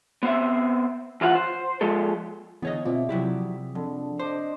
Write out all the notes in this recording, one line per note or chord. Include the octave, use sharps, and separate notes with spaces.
B3 C4 C5 E5
E3 F4 F5 F#5
C5
F3 G#3 A4
D3 E3 B3 G#4 C#5 D#5 F#5
B2 C4 F4 D5 E5
C3 F3 F#3 C4 E4 G4
F2 D3
D4 C5 D5 D#5